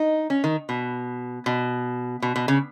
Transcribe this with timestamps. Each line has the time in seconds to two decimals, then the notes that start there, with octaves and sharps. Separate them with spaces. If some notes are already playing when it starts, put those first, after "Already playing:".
Already playing: D#4
0.30 C#4
0.44 D#3
0.69 B2
1.46 B2
2.22 B2
2.36 B2
2.48 C#3